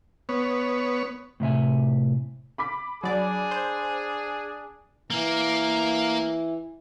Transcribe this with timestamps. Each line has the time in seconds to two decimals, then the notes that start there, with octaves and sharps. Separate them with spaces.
0.29 B3 C#5
1.40 A2 C3 E5 G#5
2.58 B5 D6 B6
3.04 F#3 D4 G#4 D5
3.51 C5
5.10 E3 A#3